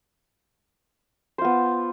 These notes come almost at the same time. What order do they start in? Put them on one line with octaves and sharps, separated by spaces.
C5 F4 B3